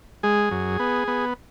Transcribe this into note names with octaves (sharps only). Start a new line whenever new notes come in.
G#3 G#4
F#2
B3
B3